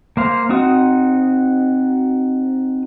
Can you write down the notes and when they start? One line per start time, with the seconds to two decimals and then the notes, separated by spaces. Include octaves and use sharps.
0.17 A#3 C5 F5
0.49 C4 D#4 F#4 D#6